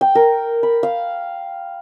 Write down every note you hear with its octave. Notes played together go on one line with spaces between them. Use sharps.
G5
A#4
B5
F5